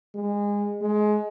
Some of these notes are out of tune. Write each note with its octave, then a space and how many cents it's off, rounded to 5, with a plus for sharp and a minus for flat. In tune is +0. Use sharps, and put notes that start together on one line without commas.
G#3 -25
G#3 +20